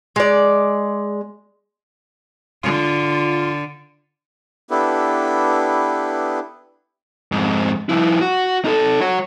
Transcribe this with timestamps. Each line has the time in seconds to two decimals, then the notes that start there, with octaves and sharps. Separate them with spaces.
0.16 G#3 D5
2.63 D3 F4
4.70 B3 D4 E4 G4 A4 B4
7.32 F2 G#2
7.89 F3 E4
8.21 F#4
8.65 D#4 A4
9.01 F#4 C#5